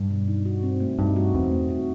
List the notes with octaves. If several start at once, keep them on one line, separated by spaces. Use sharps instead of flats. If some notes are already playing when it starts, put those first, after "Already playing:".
Already playing: G2 G3
B2
D#4
F#4
C4
A3
G2 D#4
F#4
E2 C4
A3
F#4